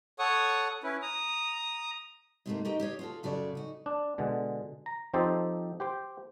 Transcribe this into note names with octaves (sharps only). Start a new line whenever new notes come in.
A4 C#5 F#5 C#6 D#6
C#4 E4 B4
A#5 D#6
G#2 C3 F3 G3 A3 A#3
D#4 F#4 G4 A#4 D#5 G5
G4 G#4 C#5 F5
F4 F#4 A4
F#2 C#3 F#4 G#4 D5
D#4 F#4
D4
B2 D3 G#3
A#5
F3 C4 D#4 G4 A4 C5
G4 C5 G5